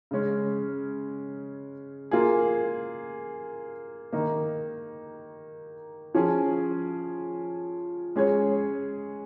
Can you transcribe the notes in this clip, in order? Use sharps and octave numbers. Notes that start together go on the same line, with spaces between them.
C#3 G#3 C#4
A#3 F4 G#4
D#3 A#3 D#4
F3 C#4 G#4
G#3 C#4 G#4 C#5